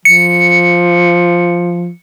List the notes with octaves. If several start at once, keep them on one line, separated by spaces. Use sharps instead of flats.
F3 C#7